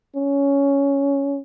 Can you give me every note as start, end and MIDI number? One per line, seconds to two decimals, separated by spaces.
0.16 1.39 61